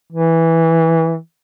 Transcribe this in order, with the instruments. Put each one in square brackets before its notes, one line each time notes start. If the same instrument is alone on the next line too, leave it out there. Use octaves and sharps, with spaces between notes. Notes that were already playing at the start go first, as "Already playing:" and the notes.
[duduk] E3